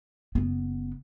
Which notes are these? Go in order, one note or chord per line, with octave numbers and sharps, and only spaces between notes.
F#1 B3